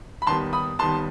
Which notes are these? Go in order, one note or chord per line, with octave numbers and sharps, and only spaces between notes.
B5
D#2 D#3 G3 B3 A5 C6
B5 D#6
D#2 D#3 G3 B3 A5 C6